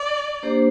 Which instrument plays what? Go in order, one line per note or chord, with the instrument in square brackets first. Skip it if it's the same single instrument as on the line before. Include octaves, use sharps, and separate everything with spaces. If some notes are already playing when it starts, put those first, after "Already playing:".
Already playing: [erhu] D5
[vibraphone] A#3 D4 G4 C5